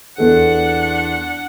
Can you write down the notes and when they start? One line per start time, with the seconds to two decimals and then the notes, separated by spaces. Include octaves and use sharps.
0.18 E2 D4 A4 F#5